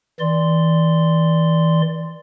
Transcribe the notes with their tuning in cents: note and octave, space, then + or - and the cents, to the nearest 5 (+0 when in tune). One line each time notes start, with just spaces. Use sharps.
E3 -25 D5 +0 C6 -10